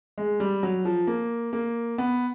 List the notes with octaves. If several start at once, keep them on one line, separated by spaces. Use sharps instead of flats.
G#3
G3
F#3
F3
A#3
A#3
B3